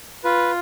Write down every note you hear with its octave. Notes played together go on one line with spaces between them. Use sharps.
F4 B4